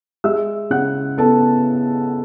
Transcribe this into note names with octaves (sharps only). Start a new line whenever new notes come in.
G#3 E5 E6
C#3 F#5 F#6
B3 A4 A5